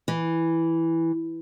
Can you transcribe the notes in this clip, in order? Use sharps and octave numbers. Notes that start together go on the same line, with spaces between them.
E3